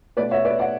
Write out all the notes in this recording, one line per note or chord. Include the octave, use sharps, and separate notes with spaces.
B2 A3 C#4 B4 D5
C#5 E5
B4 D5
D5 F#5